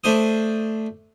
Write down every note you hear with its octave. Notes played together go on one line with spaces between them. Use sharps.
A3 D4 C5 D#6